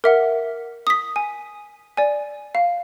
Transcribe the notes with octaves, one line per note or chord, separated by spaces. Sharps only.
A#4 E5 F#5
D#6 B6
G#5
D5 G#5
F5